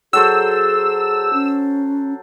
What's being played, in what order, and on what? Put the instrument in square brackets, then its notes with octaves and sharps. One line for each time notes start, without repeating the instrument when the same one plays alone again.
[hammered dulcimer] F#3 A4 C5 [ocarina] G#4 [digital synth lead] E6
[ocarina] C#4